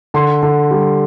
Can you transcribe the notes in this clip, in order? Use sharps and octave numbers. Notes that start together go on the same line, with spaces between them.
D3 C6
D3
G3